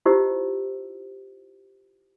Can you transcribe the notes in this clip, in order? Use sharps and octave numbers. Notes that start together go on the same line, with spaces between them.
E4 F4 G4 C5 D#5 E6